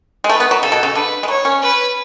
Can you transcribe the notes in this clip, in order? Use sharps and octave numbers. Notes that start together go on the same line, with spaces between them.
G#3
A3 B4
B3
F#3
C#3 A4
B2
C#3
D3 B4
G#3
F#3 C#5
C#4
B4